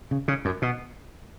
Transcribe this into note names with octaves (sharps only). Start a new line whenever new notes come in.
C#3
C#3
F#2
B2